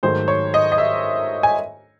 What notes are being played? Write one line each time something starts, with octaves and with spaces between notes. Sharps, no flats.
G#2 D#3 F#3 A3 C5
C#5
D#5
D#5
E5
G#5